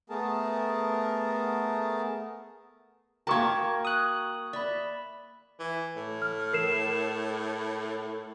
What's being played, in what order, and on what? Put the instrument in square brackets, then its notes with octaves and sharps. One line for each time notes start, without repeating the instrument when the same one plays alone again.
[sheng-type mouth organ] A3 B3 G#4 A#4 A5
[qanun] A#3 A5 [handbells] F#4 A#4 G5 [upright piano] A#5 C#6 G#6
[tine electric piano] D#6 F#6
[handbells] D5 B5 [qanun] E5
[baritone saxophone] E3
A2
[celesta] F6
A#4 C7 E7